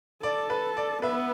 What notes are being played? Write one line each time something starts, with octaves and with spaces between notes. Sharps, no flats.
A4 D5
B4
D5
B3 B4 E5